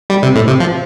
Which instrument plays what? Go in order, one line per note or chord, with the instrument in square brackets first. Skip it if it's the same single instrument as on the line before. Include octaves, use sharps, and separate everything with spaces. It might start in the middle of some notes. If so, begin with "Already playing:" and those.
[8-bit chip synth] G3
C3
A2
C3
F3